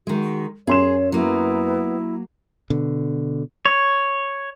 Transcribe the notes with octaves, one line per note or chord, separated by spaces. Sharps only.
D#3 G#3 F#4
F#2 G#4 C#5 C6 E7
F#3 A#3 B3 E4
B2 D3
C#5